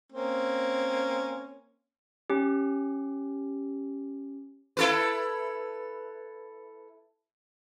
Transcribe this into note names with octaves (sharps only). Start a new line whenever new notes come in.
A#3 C4 C#4
C#4 G4
E4 A4 B4